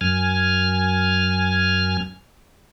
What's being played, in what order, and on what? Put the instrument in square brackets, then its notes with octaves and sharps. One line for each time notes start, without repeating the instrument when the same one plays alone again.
[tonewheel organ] F#2 G#5 F6